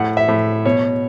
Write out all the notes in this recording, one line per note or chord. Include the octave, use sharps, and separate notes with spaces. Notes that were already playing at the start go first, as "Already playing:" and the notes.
Already playing: A2 F#5
E5
A2
B2 C#5